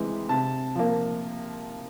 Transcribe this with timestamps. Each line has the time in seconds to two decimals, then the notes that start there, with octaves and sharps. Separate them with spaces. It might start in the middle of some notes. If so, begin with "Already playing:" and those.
Already playing: C3 E3 G#3
0.29 C3 A5
0.76 F3 A#3